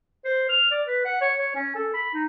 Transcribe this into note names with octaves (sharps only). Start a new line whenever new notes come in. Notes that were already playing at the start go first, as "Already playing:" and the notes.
C5
F6
D5
B4
F#5
C#5
C#5
C#4
A4
B5
D#4